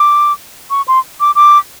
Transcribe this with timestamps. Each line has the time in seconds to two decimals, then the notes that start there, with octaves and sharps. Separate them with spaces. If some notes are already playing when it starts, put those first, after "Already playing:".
Already playing: D6
0.70 C#6
0.88 C6
1.20 D6
1.35 D6